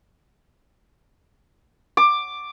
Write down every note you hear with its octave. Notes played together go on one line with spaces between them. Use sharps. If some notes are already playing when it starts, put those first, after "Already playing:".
D6